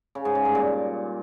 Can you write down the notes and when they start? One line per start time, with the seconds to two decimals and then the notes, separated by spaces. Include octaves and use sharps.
0.15 C#3
0.25 G#2
0.35 C#3
0.45 G2
0.55 A#2